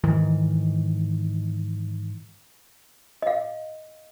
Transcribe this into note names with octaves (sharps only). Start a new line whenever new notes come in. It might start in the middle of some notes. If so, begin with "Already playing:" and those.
G#2 D#3 E3
D#5 F5